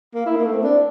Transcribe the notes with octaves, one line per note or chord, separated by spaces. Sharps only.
A#3
E4
A#3
A3
C4
D4